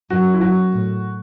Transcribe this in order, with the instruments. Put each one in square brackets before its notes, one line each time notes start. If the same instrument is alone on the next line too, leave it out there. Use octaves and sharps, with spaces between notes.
[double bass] F#2 [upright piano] F#4
[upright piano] E4
[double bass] F#2 [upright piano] F#4
[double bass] A2